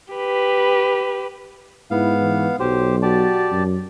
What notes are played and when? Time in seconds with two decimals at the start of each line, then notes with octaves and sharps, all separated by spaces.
0.14 G4 B4
1.91 G#2 B3 E4 F5
2.21 E3
2.60 B1 F#3 G4 C5
3.03 F#4 G4 D5 A5
3.52 F#2